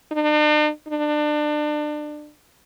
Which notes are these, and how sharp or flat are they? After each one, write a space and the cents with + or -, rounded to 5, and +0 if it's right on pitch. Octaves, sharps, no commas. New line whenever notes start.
D4 +45
D4 +30